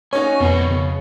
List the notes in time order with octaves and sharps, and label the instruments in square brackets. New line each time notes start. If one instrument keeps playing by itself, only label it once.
[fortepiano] C#4 D#4 F#4 [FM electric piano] C#5 [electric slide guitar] G#5
[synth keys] F2 [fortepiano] B2 [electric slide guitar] C4 D#5 F#5
[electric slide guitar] C#3